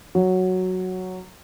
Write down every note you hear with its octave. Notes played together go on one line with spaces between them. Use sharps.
F#3